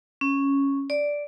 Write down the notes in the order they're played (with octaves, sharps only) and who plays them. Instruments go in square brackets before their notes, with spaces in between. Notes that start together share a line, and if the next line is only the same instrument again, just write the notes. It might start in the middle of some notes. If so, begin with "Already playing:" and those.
[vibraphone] C#4
D5